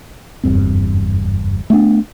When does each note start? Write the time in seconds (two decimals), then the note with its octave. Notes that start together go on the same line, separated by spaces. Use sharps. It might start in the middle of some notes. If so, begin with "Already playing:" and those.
0.44 F#1 E2 G2 C4
1.70 A3 B3 C#4 D4